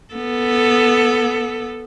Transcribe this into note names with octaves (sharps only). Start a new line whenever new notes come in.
B3 A4